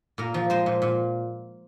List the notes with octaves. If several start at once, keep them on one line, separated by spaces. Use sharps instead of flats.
A#2 A#4
F3
G#3 C5
A#2
A#2